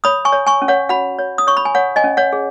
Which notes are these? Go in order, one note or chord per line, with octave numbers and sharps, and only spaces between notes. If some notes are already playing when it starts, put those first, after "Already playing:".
C#5 B5 D#6
G#5 C#6
C#5
G#5 C#6
C#4
C#5 F#5
F#4 F#5 B5
C#5
D#6
C#5 C#6
B5
G#5
C#5 F#5
D#5 G#5
C#4
C#5 F#5
G#4